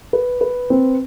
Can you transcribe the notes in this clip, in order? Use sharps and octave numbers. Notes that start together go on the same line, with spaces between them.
B4
B4
C4